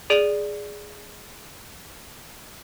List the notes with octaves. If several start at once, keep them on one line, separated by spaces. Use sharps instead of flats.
G#4 D5 D7 D#7 F#7